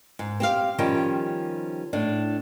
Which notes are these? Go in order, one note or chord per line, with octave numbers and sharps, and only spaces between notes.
G#2
C4 G4 F5
D#3 F3 G3 C#4 G4
A2 D4